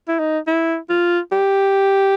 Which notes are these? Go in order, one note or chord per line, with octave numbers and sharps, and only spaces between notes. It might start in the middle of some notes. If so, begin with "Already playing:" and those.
E4
D#4
E4
F4
G4